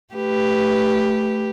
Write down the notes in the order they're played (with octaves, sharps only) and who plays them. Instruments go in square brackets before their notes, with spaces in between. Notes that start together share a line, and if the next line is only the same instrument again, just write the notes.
[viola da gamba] A3 G4 B4